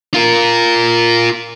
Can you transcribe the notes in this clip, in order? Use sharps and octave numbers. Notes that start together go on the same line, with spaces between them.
F4 A#4